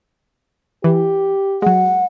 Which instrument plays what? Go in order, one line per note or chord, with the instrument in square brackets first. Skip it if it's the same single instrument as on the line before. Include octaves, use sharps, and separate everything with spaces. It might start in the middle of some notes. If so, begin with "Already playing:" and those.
[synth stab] E3 [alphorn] G4
[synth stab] F#3 G#3 [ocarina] F#5